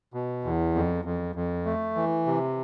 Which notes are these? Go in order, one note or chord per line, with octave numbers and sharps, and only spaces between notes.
B2
E2
F2
F2
F2
A3
E3
C3